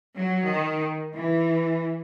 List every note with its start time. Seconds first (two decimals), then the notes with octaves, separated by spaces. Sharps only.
0.17 F#3
0.49 D#3
1.14 E3